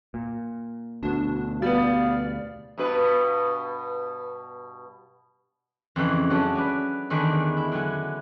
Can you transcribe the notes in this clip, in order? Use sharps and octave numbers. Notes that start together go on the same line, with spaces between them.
A#2
D2 B2 D4
G3 B3 D5 F5
G2 B2 B4
F2 C#3 E3
F#3 C#4 D4 A4
B4 D5 G#5
E2 D3 D#3 D4 G#4 B4
E4
D3 F#3 G#5